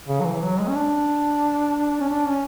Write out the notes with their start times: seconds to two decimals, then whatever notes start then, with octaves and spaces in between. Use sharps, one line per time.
0.08 C#3
0.21 F#3
0.25 E3
0.42 F#3
0.59 G#3
0.69 C#4
0.75 D4
2.00 C#4
2.09 D4
2.27 C#4